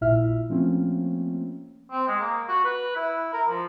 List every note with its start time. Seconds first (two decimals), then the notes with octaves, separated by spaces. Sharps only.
0.01 A#1 A#2 E4 E5 F6
0.50 F3 A3 A#3 C4 C#4
1.92 C4
2.08 G#3
2.20 A#3
2.48 F#4
2.65 B4
2.96 E4
3.33 A#4
3.49 F3